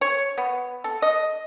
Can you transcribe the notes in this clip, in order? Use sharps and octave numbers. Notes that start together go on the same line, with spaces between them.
C#5
B3
A4
D#5